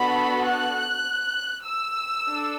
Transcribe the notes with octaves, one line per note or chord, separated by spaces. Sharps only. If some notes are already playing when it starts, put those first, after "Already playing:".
Already playing: B3 D4 F#4 A4 B5
F#6
E6
D4 A4